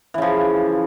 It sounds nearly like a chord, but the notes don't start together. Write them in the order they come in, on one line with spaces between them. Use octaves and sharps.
E3 C#3 F3